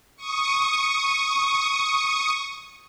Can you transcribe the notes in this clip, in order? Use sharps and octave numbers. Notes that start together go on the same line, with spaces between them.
C#6 D#6